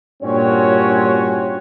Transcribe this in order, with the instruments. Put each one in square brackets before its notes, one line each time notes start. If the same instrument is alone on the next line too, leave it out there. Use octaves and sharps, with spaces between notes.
[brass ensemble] G2 A#2 C4 C#4 F#4 C#5